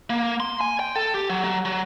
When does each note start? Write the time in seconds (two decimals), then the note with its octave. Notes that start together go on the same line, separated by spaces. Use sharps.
0.10 A#3
0.40 C6
0.61 G#5
0.80 G5
0.96 A4
1.14 G4
1.30 F#3
1.44 F#3
1.65 F#3